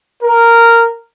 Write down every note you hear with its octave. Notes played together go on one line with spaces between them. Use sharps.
A#4